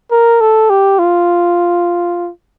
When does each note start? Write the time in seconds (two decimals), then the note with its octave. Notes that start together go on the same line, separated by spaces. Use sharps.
0.11 A#4
0.41 A4
0.70 G4
0.99 F4